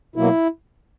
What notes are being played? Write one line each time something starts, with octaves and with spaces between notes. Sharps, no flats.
B2 F#3 A#3 E4